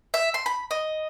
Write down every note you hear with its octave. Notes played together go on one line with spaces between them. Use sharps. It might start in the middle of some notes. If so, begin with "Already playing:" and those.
E5
C6
B5
D#5